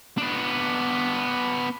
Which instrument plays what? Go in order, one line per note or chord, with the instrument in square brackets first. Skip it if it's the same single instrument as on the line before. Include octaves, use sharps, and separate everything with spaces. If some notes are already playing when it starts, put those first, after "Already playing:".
[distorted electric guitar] B3 D4